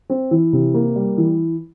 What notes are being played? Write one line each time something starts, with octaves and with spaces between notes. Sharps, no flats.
C4
E3
C3
A#3
G3
E3